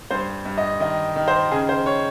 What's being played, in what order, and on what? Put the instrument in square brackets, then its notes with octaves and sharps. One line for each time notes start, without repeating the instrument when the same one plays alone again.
[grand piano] G2 C5
G2
D#5
D#3 D#5
D#3
C5
C#3 G#4
C5
C#5